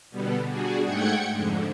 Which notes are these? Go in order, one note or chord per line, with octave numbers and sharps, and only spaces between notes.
B2 D3 G3 B3
G3 D4 F#4 G#4
G#2 A3 F#5 G5 G#6 C#7
F2 G#2 D3